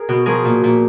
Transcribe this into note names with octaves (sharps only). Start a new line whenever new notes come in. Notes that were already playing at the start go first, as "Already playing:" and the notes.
Already playing: G#4 A#4
B2
F3 G#4 A#4
A#2
A#2